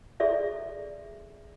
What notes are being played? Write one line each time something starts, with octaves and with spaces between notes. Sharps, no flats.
G#4 A4 D5 E5